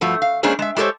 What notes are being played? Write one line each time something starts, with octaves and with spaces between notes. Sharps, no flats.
G2 F3 A3 F#4
F5
G#3 A#3 C#4 D4 G#4 C5
G#3 E5
G#3 G4 A4 A#4 C5 C#5